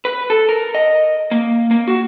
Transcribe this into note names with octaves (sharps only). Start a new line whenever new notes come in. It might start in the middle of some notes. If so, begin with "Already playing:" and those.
B4
A4
A#4
D#5
A#3
A#3
F#4